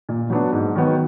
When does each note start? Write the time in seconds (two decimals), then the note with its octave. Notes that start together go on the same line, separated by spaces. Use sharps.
0.09 A#2
0.30 F#3 B3 D4
0.52 G#2
0.75 D#3 F#3 B3